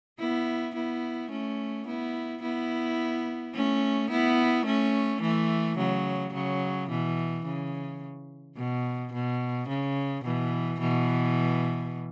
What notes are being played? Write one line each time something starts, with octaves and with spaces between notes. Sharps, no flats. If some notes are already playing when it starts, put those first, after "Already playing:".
B3 E4
B3 E4
A3 C#4
B3 E4
B3 E4
A3 C#4
B3 E4
A3 C#4
E3 A3
C#3 F#3
C#3 F#3
B2 E3
C#3
B2
B2
C#3
B2 E3
B2 E3